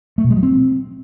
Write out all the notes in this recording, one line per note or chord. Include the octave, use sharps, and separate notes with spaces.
A3
B2
G#3
F#3
C4